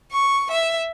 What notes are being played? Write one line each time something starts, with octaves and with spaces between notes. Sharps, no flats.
C#6
E5